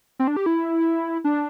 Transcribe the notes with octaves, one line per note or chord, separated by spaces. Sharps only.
C4
D4
G4
E4
D4